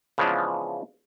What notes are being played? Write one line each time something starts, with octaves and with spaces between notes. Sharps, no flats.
C#3 E3 F3 G#3 B3 D4